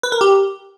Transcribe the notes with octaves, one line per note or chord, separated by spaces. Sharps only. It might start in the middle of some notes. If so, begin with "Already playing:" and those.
B4
A#4
G4